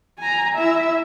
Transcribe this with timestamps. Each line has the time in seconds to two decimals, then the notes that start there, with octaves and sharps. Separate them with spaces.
0.19 G#5 A#5
0.55 E4 E5